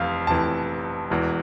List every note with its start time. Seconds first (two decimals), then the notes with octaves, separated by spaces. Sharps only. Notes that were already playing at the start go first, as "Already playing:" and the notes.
Already playing: F1 F2 E3 F5
0.27 F1 F2 E3 A5
1.10 E1 E2 E3